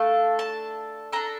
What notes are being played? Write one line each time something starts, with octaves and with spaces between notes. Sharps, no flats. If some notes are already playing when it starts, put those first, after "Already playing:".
Already playing: A3 D4 A4 F5
A5
D4 A4 A#5